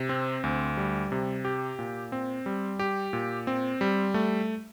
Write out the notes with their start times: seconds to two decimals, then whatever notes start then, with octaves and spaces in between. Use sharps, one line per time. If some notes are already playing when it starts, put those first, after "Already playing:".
Already playing: C3
0.09 C4
0.44 D2
0.77 G3
1.12 C3
1.45 G4
1.79 A#2
2.12 C4
2.46 G3
2.79 G4
3.13 A#2
3.47 C4
3.81 G3
4.14 A3